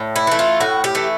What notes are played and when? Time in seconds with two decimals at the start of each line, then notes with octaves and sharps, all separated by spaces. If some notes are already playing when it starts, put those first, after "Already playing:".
Already playing: A2
0.16 E4
0.27 E3 A3
0.39 F4
0.60 A2 F#4
0.84 G4
0.95 E3 A3